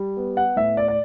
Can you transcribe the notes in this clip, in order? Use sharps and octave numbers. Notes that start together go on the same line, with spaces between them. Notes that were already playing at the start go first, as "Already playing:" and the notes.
Already playing: G3
B3
F#5
A2 E5
D5
D5